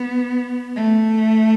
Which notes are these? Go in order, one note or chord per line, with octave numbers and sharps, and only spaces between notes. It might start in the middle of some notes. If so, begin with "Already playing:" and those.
Already playing: B3
A3